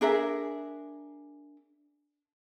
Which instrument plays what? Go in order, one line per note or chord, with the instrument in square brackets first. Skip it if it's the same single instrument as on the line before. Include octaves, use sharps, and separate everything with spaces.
[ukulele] D4 G#4 A#4 E5